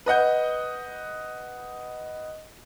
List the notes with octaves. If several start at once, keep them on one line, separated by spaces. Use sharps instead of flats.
B4 D#5 F#5 G6